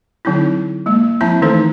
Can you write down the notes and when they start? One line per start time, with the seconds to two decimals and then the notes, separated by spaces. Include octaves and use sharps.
0.25 D3 F#3 C4 D#4 E4
0.86 G#3 A#3
1.21 F3 C4 E4 E5 A5 A#5
1.42 D#3 E3 A3 D#4 A4 C5